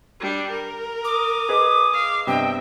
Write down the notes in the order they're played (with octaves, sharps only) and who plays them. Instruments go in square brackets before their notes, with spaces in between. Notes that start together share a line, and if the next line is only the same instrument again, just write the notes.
[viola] G3 D4
A#4
[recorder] D6 [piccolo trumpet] D#6
[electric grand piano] G#4 B4 D#5
[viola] F5
[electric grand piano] G2 C3 B3 [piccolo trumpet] D#5 [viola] E5 [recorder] G5